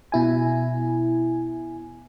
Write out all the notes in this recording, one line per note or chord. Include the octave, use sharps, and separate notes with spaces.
B2 E4 G#5